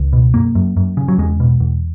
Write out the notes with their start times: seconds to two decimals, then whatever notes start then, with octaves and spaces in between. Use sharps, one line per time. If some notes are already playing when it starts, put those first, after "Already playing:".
Already playing: C#2
0.13 B2
0.34 F#2 A#3
0.55 F#2
0.77 F#2
0.97 C#3
1.08 F#3
1.18 E2 G#3
1.40 B2
1.60 E2